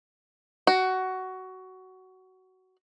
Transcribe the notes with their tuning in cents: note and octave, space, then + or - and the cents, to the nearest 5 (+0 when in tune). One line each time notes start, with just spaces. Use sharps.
F#4 +15